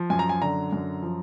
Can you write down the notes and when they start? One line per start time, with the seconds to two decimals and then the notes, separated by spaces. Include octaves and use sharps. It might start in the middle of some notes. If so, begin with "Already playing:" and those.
Already playing: F3
0.10 F#2 G#5
0.19 A#5
0.29 G#5
0.41 D3 A#5
0.73 F#2
1.03 F3